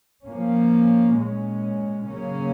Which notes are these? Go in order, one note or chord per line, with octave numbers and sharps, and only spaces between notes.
F3 A#3 C#4
A#2 G#3 C#4
C#3 F#3 A#3 C#4